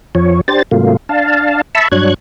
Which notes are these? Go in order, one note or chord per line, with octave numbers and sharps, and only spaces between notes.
F2 F3 C#5
D4 G4 C5 A6
G#2 C3 F#3 A3 A#3 F4
D4 F5 A5
E5 A5 B5 C#6 E6
G2 F#3 D4 C#5 F#6 G#6